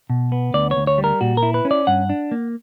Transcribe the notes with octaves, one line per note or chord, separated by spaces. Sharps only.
B2
B3
D2 D5
C#5
D2
C#5
G3
A#4
A#2 F#4
A#4
E4
B4
C#4
D5
G2 F#5
D4
A#3